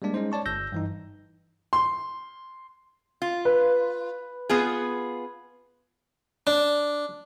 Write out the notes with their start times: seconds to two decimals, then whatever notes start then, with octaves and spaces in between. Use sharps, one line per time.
0.02 G3 G#3 A#3 D4 D5
0.14 G#3 C#4 D#4 C5
0.32 C#5 D5 A5 C#6
0.46 G1 E6 G6 A#6
0.72 G2 E3 D#4
1.73 C6
3.22 F4
3.45 B4
4.49 B3 F4 G#4
6.47 D4